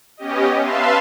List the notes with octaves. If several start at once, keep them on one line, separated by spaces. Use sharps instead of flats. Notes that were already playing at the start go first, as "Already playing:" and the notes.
B3 C#4 G4 D#5
B4 E5 F5 A5 C6